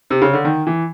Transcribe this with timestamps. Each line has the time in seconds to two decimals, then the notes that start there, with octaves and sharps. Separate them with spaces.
0.10 C3
0.22 C#3
0.33 D3
0.45 D#3
0.67 E3